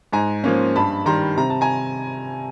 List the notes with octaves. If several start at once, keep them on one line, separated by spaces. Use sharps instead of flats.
G#2 G#5 A#5
F3 A#3 C#4
G2 A5 B5
D#3 G3 A#5 C6
C3 A#5
A5
G#5 A#5